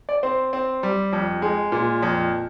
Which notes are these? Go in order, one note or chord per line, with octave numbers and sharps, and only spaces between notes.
D5
C4 C5
C4
G3
F2
G#3
A#2
F2